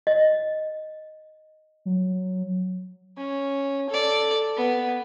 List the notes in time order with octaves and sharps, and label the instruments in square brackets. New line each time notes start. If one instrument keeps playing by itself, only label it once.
[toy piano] D#5
[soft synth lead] F#3
[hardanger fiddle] C#4
A4 D5
B3